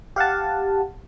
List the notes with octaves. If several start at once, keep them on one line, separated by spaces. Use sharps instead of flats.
G4 F5 F#5 A5